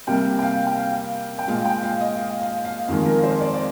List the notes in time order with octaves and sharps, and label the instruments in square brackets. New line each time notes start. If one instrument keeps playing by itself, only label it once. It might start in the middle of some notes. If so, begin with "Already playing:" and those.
[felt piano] C3 G3 A#3 G5
G5
F5
G5
F5
G5
A#2 G#3 F5
G5
F5
D#5
F5
F5
F5
F2 D#3 G#3 F5
A#4
C5
D5
D5